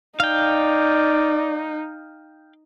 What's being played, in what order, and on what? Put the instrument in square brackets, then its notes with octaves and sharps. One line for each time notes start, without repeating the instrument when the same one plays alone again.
[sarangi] D#4 [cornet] D5 [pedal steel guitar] F5 G5